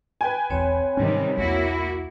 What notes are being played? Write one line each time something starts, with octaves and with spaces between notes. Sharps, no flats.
B4 G5 G#5
E1 B1 E2 C4 C#5
G#2 C3 D#3 G3 C#4
B1 E2 A#3 E4 F#4